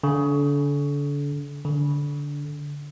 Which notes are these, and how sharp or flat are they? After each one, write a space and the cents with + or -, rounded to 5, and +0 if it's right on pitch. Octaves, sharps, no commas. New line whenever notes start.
D3 -35
D3 -20